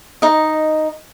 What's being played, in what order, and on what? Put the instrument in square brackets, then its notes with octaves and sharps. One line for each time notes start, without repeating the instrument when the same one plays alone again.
[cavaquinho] D#4 D#5